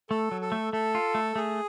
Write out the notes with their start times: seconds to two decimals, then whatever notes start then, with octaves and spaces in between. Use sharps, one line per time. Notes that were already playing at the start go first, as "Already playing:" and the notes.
0.10 A3 A4
0.31 F#3
0.41 A4
0.52 A3
0.73 A3 A4
0.95 F4
1.15 A3
1.36 A3 G#4